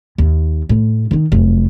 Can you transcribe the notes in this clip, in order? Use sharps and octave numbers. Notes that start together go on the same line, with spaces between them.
D#2
A2
D#3 D#4
F1 F#2